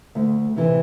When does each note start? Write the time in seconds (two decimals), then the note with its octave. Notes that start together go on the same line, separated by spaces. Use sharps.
0.15 D2
0.56 C3 E3